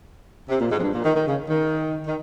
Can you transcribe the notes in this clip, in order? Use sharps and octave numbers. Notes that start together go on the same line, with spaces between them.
C3
A#2
G#2
F2
G2
A#2
D#3
D#3
C#3
D#3
D#3